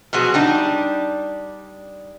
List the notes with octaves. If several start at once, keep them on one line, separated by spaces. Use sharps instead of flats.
B2 F3 F#3 F#4 G#4
G3 D4 D#4